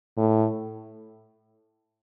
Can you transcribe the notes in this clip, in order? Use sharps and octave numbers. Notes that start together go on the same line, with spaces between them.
A2